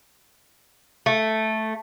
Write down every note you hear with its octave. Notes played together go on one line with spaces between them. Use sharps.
A3